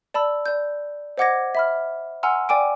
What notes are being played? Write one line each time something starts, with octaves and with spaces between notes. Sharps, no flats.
D5 A5 B5 E6
D5 G6
C5 D#5 F#5 D6 G#6 A#6
E5 B5 F6
F#5 G#5 A#5 C6 E6 F6
D5 G5 G#5 D6 D7